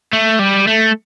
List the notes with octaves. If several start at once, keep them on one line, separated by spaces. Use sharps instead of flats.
A3
G3
A3